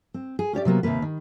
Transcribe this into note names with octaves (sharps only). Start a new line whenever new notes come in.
C4
G#4
C#4 G4 C#5 D5
C3 F#3 A#3 B3
D#2 C3 E3 A#3 B4
D#3